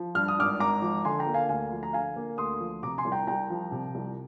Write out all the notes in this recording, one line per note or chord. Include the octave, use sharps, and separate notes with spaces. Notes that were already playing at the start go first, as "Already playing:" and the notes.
Already playing: F3
G2 F6
D#6
G#1 D6 F6
G#1 A#5 D6
F3
D3 G#5 C6
G5 A#5
A#3
F5 G#5
D2 F5 G#5
F3
A#5
D3 F5 G#5
A#3
D2 C6 D#6
F3
C3 A#5 D6
G#5 C6
C2
G5 A#5
C2 G5 A#5
F3
C3
C2